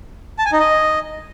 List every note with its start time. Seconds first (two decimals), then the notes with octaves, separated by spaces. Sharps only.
0.39 A5
0.46 G#5
0.53 D#4
0.60 D#5